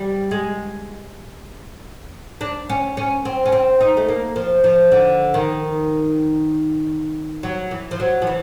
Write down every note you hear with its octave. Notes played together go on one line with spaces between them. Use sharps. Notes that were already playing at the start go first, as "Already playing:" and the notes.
Already playing: G3
G#3
D4
C#4
C#4
C4
C#4
C4
D#4
A3
A#3
F3
F3
D3
D#3
F#3
E3
F3
F#3
F3
E3